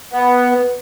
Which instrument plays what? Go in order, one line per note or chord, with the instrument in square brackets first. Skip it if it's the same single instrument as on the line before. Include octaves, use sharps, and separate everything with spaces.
[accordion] B3 [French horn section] B4